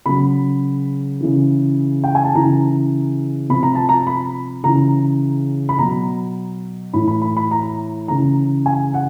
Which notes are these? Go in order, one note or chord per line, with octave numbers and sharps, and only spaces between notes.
C#3 F#3 B5
C#3 E3
G5
G#5
A5
C#3 E3 A#5
C3 F3 B5
A#5
A5
A#5
B5
C#3 E3 A#5
B5
B2 F#3 A#5
A2 E3 B5
B5
B5
B5
A#5
C#3 E3 A#5
G#5
F#5